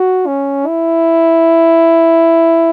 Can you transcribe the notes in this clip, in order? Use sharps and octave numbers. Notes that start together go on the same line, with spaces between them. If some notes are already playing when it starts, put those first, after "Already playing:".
Already playing: F#4
C#4
E4